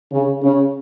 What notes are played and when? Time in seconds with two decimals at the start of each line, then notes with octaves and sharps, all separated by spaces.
0.12 C#3
0.42 C#3